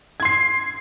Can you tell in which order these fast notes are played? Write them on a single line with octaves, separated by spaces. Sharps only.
G#6 C6 C7